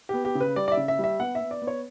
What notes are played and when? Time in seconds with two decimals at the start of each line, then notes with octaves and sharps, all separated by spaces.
0.09 B3 G4
0.25 G4
0.35 C#3
0.40 B4
0.56 G3 D5
0.68 D5
0.72 E5
0.77 C#3
0.88 E5
0.99 G3 E5
1.20 B3 F#5
1.35 E5
1.41 B3
1.51 D5
1.62 B3
1.67 C#5